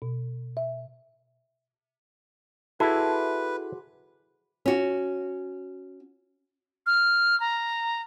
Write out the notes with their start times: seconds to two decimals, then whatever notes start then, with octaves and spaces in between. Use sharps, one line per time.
0.02 B2
0.57 E5
2.80 E4 F#4 G#4 A4 B4
4.66 C#4 F#4
6.86 F6
7.40 A#5